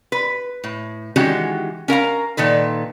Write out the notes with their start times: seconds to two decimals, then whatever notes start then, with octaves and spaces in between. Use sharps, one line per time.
0.12 B4
0.64 A2
1.16 D#3 E3 G#3 C#4 F#4 G4
1.88 C#4 A#4 F5 A#5
2.37 A#2 D#3 A4 B4